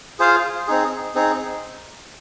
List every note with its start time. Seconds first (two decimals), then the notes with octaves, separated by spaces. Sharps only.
0.19 F4 G#4 C5 F5
0.68 C4 D#4 G#4
1.15 C4 D#4 G#4